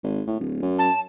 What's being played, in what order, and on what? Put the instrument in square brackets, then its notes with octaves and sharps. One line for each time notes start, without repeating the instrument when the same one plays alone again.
[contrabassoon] G#1
A2
D1
F#2
[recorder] A5